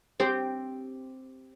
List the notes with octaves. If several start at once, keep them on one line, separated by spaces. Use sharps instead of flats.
C4 G4